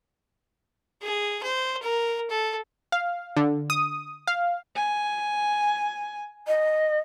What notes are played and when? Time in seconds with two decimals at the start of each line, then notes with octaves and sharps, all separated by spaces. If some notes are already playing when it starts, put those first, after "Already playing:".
1.03 G#4
1.43 C5
1.83 A#4
2.30 A4
2.92 F5
3.37 D3
3.70 D#6
4.27 F5
4.76 G#5
6.47 D#5